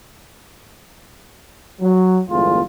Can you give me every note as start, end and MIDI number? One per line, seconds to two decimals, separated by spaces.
1.81 2.19 54
2.29 2.60 31
2.29 2.60 40
2.29 2.60 56
2.29 2.60 57
2.29 2.60 65